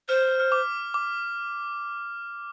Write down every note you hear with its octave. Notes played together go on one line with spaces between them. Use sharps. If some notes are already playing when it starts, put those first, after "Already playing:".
C5 F6
F6
D6
D6